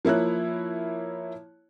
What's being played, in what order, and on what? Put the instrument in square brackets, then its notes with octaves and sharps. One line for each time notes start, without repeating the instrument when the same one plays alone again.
[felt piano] F3 A#3 E4 C#5 F#6